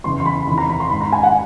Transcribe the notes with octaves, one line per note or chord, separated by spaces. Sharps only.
E2 C#3 E3 C6
C6
B5
E2 C3 D#3 B5
A#5
B5
C6
G#2 D#3 B5
A#5
G#5
F#5